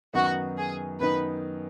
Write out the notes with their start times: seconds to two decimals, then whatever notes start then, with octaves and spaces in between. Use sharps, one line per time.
0.14 F#2 D#3 B3 D#4 F#4
0.57 G#4
1.01 F#2 D#3 B3 D#4 B4